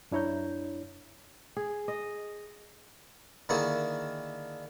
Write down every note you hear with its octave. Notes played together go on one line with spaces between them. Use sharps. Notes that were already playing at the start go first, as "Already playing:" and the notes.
F#2 D4 E4 C#5 A#5 G6
G#4
D#5
D3 D#3 A#3 E4 G#4 C#6